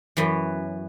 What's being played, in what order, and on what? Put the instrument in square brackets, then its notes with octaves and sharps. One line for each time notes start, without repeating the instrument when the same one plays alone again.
[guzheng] F#2 E3 B3